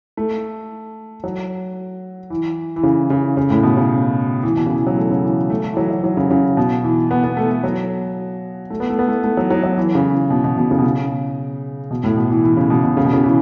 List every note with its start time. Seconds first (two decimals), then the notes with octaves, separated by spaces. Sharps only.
0.17 A3
1.24 F#3
2.30 E3
2.76 E3
2.83 C#3
3.10 C#3
3.37 C#3
3.50 A2
3.63 B2
3.77 C#3
4.43 E3
4.56 B2
4.66 C#3
4.76 E3
4.87 F#3
4.97 A3
5.10 C#3
5.24 E3
5.50 A3
5.64 A3
5.73 E3
5.77 F#3
5.91 F#3
6.04 F#3
6.17 C#3
6.30 C#3
6.57 B2
6.84 E3
7.11 B3
7.24 B3
7.37 A3
7.51 A3
7.63 F#3
8.70 A3
8.80 B3
8.90 A3
8.99 B3
9.08 A3
9.24 A3
9.37 F#3
9.50 F#3
9.63 F#3
9.77 E3
9.95 C#3
10.30 B2
10.44 B2
10.57 B2
10.71 C#3
10.79 B2
10.84 C#3
11.91 B2
12.04 A2
12.16 B2
12.30 E3
12.44 E3
12.57 C#3
12.70 B2
12.84 B2
12.97 C#3
13.05 B2
13.13 C#3
13.24 E3